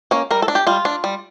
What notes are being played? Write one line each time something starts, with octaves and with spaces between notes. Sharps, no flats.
A#3 C#4
G3 A#4
A4
D4
G4
G3 F4
D4
G3